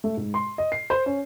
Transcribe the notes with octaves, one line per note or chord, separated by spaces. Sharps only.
A3
G#2
C6
D#5
C7
C5
C#4